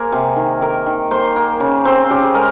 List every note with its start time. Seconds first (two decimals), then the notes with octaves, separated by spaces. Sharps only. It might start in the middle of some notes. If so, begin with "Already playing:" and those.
Already playing: A#3 G#4 A#4 C5
0.12 C3
0.36 D#3
0.61 D#3 A#4
0.86 D#3
1.11 A#3 C5
1.36 A#3
1.60 C#3
1.85 C4 C5
2.10 C#3 G4
2.23 G#4
2.34 G#3 A#4